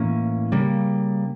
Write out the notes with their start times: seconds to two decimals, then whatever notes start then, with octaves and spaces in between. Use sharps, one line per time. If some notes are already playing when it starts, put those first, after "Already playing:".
Already playing: A2 E3 A#3 C#4
0.52 C#3 G3 A#3